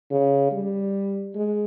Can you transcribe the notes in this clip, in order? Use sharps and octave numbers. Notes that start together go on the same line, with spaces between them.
C#3
G3
G#3